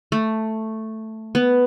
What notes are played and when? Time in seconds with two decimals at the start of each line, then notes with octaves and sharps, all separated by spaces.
0.12 A3
1.35 B3